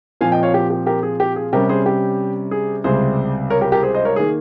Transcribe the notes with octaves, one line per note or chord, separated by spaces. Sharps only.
A#2 F3 C4 F5 G#5
D#5 G5
C#5 F5
G4
G4
G4 A#4
G#4
G4
G#4
C3 G3 C#4 G4 A#4
G#4 C5
G4
G#4
C#2 C3 G3 G#4 C5
A#4 C#5
G4 A#4
G4 A#4
G#4 C5
C5 D#5
A#4 C#5
D#3 A#3 G#4